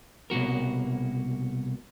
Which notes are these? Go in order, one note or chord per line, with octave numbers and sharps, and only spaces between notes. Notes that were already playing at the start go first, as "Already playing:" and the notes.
C2 B2 A#3 F#4 A#4